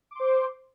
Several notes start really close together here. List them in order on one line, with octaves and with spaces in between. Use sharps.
D6 C6 C5